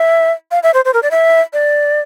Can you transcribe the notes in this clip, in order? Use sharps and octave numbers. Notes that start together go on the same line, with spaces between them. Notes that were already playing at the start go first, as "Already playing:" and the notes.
Already playing: E5
F5
E5
C5
C5
A#4
D5
E5
D5